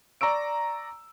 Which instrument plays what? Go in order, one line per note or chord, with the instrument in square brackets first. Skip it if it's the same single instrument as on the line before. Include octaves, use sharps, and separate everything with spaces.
[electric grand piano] D5 A#5 C#6 E6 D7